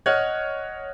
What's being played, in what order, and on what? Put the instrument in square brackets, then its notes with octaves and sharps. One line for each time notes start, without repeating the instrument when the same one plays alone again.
[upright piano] C#5 D#5 F#5 F6 F#6 G#6